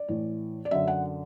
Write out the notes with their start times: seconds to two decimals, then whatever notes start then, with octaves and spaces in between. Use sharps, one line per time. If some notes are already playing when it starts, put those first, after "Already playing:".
Already playing: D5
0.08 A2 E3
0.65 D5
0.71 F#2 D3 E5
0.88 F#5